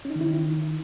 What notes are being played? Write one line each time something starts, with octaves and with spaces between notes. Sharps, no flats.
C#4
D#4
D#3
E4
D#3